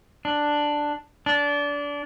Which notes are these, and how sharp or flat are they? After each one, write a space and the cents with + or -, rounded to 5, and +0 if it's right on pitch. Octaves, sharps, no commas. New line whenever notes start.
D4 +5
D4 -25